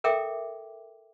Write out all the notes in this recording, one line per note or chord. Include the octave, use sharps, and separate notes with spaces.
A4 A#4 E5 G5 D6